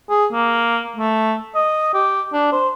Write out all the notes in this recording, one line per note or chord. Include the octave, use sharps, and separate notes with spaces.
G#4
A#3
A3
D#5
G4
D4
C5